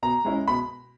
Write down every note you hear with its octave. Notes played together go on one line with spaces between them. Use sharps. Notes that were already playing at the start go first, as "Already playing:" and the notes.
B2 A#5
G#3 C#4 E4
B2 B5